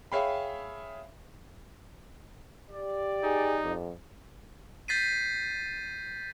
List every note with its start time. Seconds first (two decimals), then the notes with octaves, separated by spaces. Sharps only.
0.12 G#4 C#5 E5 F5 G5 B5
2.70 G4 D5
3.23 D#4 G#4
3.64 F2
4.88 G6 A6 B6 C7 D#7